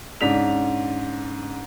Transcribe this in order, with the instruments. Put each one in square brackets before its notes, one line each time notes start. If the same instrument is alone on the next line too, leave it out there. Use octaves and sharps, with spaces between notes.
[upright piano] G#2 C#3 D4 B6 F7